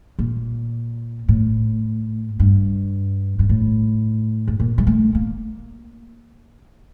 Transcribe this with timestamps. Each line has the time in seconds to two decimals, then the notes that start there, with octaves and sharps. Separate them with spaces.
0.19 A#2
1.29 A2
2.40 G2
3.39 G2
3.49 A2
4.48 A2
4.60 A#2
4.78 G3
4.87 A3
5.15 A#3